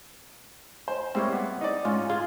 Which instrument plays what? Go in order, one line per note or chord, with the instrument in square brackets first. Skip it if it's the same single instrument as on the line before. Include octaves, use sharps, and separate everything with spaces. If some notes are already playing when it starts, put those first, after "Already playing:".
[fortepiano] C5
[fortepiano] G3 G#3 A#3 [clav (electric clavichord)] C4 E4 C#5
[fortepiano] B3
D#4 D5
[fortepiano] G#2 [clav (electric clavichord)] C#4 F4
[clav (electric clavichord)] F4 [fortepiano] G#4